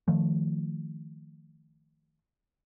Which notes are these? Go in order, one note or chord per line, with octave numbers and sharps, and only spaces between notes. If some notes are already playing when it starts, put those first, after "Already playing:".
D#3 F3 A3